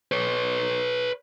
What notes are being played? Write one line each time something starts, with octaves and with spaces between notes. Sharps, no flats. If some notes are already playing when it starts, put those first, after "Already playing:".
B4 C#5